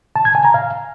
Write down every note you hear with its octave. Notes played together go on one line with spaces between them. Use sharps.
A5
G#6
G#5
A#5
F5